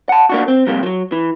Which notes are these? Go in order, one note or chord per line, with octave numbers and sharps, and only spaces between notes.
F#5 A5
A#3 D4 F#4
C4
F2 C3 G3 A#3
F3 F#3
E3